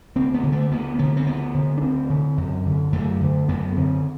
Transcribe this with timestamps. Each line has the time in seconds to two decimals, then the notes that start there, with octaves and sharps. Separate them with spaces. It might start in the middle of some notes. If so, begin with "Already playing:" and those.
0.16 D2 C4
0.34 B3
0.43 D3
0.52 A3
0.71 D2 B3
0.99 D3 B3
1.17 C4
1.26 D2 B3
1.55 D3
1.78 D4
1.81 D2 C4
2.10 D3
2.38 F#2
2.66 D3
2.92 F#2 A3
3.21 D3
3.49 F#2 B3
3.77 D3 C4